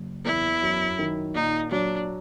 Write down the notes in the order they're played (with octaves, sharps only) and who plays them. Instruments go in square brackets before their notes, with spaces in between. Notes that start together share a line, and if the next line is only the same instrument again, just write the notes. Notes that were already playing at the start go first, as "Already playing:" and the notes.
Already playing: [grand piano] F#1
[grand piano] E2 [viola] E4
[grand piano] F#2
D#3
[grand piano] A#2 [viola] D#4
[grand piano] F#3 [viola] D4